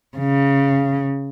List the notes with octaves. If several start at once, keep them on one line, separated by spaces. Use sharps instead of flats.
C#3